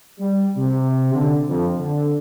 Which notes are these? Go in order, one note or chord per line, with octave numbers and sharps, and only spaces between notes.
G3
C3
D3
F2
D3